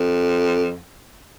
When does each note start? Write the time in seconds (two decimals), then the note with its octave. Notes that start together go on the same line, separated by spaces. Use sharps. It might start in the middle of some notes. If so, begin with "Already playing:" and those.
Already playing: F2